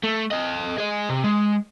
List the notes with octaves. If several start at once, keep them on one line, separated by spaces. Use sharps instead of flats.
A3
A4 D#5
G#4 D#5
C3
G#3